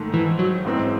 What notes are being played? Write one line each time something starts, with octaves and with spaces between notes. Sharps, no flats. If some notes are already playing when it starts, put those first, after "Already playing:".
Already playing: G#2 D#3 A3
E3
F#3
A1 G#2 E3 G#3 C4